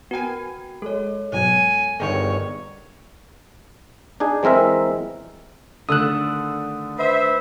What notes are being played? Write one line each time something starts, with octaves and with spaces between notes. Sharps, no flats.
B3 F#4 A#4 G5 G#5
G#3 A4 C#5
G#2 B2 F#3 G#5
G1 D#3 G#4 C#5 G5
D4 D#4 G#4
E3 G#3 C4 A#4 E5
D3 D#3 A3 D4 D#6 E6 F#6
B4 C5 E5